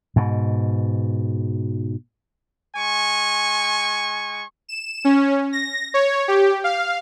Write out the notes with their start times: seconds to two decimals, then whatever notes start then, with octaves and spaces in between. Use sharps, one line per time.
0.16 G#2 B2
2.77 G#3 G#5 C#6
4.69 E7
5.05 C#4
5.53 A#6
5.94 C#5
6.28 G4
6.64 F5